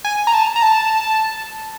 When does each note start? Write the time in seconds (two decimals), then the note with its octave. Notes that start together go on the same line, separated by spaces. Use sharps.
0.05 G#5
0.27 A#5
0.34 A5
0.56 A#5
0.62 A5